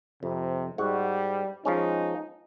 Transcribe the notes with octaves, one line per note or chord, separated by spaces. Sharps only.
F2 C3
G#2 G3 F#4 F#5
F3 G#3 C#4 D#4